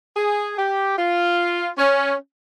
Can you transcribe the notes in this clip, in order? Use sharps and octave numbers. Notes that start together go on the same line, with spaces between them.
G#4
G4
F4
C#4